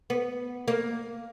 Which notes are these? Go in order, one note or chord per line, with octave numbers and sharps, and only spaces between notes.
B3
A#3